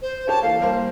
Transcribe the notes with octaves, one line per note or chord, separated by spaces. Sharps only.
C5
G4 C#5 A5
E3 A#3 A4 F5
G3 A#3 C5